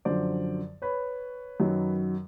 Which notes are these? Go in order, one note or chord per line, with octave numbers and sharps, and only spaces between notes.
F#2 D3 F3 C5 D5
B4 C#5
F#2 D#3 F#3